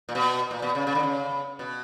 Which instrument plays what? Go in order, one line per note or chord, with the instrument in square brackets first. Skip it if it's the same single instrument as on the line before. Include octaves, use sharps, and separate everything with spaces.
[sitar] A#2
B2
A#2
B2
C#3
C#3
D3
C#3
B2